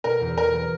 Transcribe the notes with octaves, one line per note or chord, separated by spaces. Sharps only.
B2 A#4
E2
B2 A#4
F#3